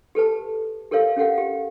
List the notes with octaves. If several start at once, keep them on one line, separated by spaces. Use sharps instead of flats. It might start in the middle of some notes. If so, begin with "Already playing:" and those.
G4 A4 B4 A5
G4 A4 A#4 C#5 F5
C#4 G4 A4 F5 F#5
G4